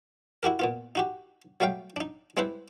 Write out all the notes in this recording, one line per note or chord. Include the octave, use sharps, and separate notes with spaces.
E4 F#4 G4 A#4
A#2 B3 F4
D#4 F#4 G4
F#3 G3 A3 F5 G5
D4 D#4
G3 G#3 C4 E4 B4 C5